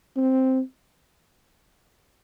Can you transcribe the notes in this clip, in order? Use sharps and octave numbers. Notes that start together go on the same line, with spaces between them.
C4